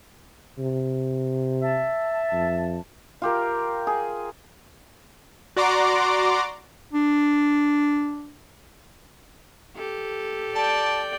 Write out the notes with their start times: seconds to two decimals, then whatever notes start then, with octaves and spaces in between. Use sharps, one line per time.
0.58 C3
1.62 E5 A5
2.33 F2
3.22 F4 G4 A#4
3.87 G#4
5.57 F#4 D5 A#5 C6 D6
6.93 D4
9.76 G4 A4
10.55 D5 G5 A5